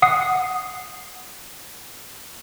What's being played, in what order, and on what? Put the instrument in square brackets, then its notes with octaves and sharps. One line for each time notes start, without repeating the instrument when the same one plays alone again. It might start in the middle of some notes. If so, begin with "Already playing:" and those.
[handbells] F#5 D#6 C7